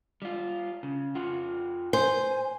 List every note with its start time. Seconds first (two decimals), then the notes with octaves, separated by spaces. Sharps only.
0.22 G3 F4
0.83 C#3
1.15 F2 F4 F#5
1.93 C5 G#5